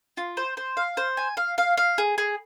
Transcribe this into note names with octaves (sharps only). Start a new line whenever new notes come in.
F4
C5
C5
F5
C5
G#5
F5
F5
F5
G#4
G#4